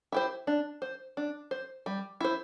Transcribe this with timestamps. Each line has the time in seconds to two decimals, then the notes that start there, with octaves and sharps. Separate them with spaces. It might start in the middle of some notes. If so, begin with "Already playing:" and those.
0.12 E4 G4 C5
0.47 D4
0.82 C5
1.17 D4
1.51 C5
1.86 G3
2.21 E4 C5